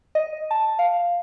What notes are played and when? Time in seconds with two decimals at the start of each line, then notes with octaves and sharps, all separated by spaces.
0.15 D#5
0.51 A5
0.79 F5